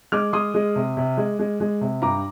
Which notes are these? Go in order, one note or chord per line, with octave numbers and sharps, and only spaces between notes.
G#3 D6 F6
G#3 C6 D#6
G#3
C3
C3
G#3
G#3
G#3
C3
G2 A#5 D6